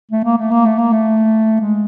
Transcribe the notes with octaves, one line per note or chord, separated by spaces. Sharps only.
A3
A#3
A3
A#3
A3
A#3
A3
G#3